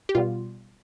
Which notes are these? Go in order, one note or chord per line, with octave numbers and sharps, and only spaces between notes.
G4
B2 G3 B3 F4